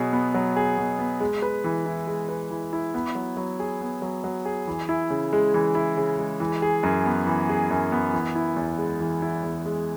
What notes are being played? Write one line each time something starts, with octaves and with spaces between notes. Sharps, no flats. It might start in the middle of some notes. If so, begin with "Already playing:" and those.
Already playing: B2 F#3 G#4
B3
F#3
G#4
B2
B3
G#3
B4
E3
E4
G#3
B4
E3
E4
B3
F#3
F#3
G#4
B3
F#3
F#3
G#4
E3
E4
C#3
G#3
E3
E4
C#3
G#3
E3
G#4
F#2
B3
E3
G#4
F#2
B3
E3
E4
E2
G#3
E3
E4
E2
G#3